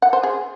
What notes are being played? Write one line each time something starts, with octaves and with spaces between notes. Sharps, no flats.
F#5
C5
G#4